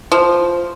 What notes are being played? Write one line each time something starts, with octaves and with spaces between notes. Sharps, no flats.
F3